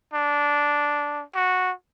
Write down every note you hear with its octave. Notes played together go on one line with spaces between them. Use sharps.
D4
F#4